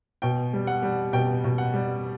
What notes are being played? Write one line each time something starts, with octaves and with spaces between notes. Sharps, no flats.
B2 G5
G3
F#5
G3
B2 G5
B2
F#5
G3